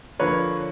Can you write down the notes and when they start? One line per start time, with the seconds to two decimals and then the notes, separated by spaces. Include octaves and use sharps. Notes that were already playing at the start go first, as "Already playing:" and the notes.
0.19 D3 F3 A#3 B4 C#5